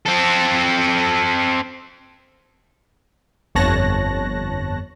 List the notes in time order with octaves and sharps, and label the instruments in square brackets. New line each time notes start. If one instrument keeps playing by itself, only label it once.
[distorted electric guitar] C4 A4
[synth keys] G1 F2 C#5 A5 F#6 A#6